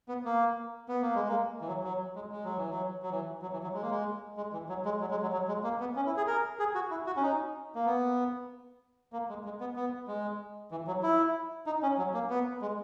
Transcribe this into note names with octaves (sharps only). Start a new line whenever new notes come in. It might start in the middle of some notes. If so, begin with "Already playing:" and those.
B3
A#3
B3
A#3
G#3
A#3
E3
F#3
F#3
G#3
G#3
F#3
E3
F#3
F#3
E3
F#3
E3
F#3
G#3
A#3
G#3
G#3
E3
F#3
G#3
F#3
G#3
F#3
F#3
G#3
A#3
B3
C#4
E4
G#4
A#4
G#4
F#4
E4
F#4
C#4
D#4
A#3
B3
A#3
G#3
G#3
B3
B3
G#3
E3
F#3
E4
D#4
C#4
F#3
A#3
B3
G#3